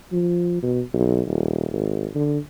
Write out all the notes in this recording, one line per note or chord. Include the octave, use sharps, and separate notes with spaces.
F3
B2
B1
D#1
G#1
D3